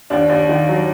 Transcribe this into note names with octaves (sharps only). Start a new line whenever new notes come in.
D#2 D4
D#2
D#3
F#3